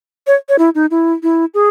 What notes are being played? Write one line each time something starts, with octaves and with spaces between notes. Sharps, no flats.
C#5
C#5
E4
D#4
E4
E4
G#4